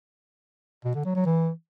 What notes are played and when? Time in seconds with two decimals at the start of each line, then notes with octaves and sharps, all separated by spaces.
0.85 B2
0.95 D3
1.05 F#3
1.15 F#3
1.26 E3